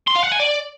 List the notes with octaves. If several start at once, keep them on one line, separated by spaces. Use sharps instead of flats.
C6
F5
F#5
G#5
D5